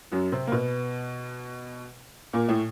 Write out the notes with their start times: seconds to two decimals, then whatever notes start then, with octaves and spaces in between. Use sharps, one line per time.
0.12 F#2 F#3
0.32 C3 C4
0.47 A#3
0.52 B2 B3
2.33 A#2 A#3
2.48 A2 A3